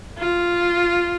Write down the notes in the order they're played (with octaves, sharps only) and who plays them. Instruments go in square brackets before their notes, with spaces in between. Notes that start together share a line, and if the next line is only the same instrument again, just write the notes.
[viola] F4